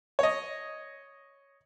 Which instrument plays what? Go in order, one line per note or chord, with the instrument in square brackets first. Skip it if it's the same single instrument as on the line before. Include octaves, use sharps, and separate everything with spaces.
[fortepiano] C#5 D#5